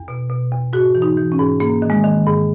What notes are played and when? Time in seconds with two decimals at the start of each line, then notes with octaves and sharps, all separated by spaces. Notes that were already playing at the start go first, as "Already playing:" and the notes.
Already playing: E2
0.08 B2
0.30 B2
0.52 E2
0.73 G#2 F#4
0.95 E3
1.02 D#4
1.17 E3
1.32 C#4
1.39 G#2
1.60 G#2 A#3
1.82 D#3
1.90 G#3
2.04 D#3
2.26 G#2